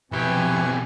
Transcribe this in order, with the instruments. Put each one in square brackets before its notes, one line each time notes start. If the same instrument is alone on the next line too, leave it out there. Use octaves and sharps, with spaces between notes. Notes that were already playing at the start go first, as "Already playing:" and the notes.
[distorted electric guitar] B1 G4 [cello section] C3 F3 [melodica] E4 B4 C#6 [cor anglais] G#5